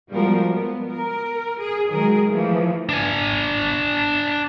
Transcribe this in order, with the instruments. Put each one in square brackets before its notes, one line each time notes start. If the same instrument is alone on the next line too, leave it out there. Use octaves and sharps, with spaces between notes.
[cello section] F3 G3 G#3 B3 F#4 A#4
B3
A#4
G#4
D#3 F#3 G#3 G#4 A#4
E3 F3 A3
[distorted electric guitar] D4 G#5